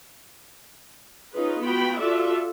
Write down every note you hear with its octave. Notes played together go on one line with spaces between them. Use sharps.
C#4 D#4 F4 G#4 B4
B3 F4 F#4 G5 B5
F4 F#4 A4 D5 E5